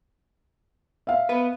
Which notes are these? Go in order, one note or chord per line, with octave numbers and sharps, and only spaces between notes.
E5 F5
B3 B4